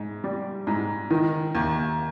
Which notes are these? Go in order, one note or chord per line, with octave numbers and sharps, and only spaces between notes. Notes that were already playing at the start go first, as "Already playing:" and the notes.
Already playing: G#2
G3
G#2
D#3
D#2